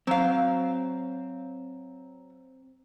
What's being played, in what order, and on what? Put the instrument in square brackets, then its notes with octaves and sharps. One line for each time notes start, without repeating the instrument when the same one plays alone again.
[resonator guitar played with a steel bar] F#3 F5 [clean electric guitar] C4